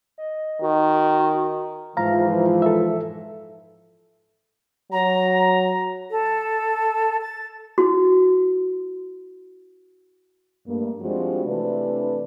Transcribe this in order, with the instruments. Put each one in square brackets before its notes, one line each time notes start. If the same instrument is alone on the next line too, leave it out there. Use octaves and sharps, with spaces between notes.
[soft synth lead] D#5
[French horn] D#3 [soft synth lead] F#4
[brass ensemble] G#2 E3 F3 [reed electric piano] F5 A#5
[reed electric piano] A4 E5
[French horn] F#3 [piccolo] A#5
[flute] A4
A6
[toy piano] E4 F#4
[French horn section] G2 A3 A#3
F3 G3 G#3 C4 D4 F#4
C3 E3 A3 D4 B4